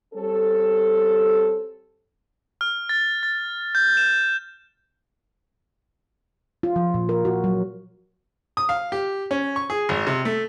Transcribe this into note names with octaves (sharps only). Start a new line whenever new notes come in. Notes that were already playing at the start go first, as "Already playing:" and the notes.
G3 C4 C#4 A4
F6
A6
A6
G6
E7
F4
F3
A#2
A#4
F#4
F#3
D#6
F5
G4
C#4
C#6
G#4
G#1
C3
A3